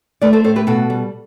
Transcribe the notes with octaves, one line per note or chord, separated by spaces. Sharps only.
A3 B4 D5
A4 C5
A2 A4 C5
G4 B4
B2 F#4 A4
G3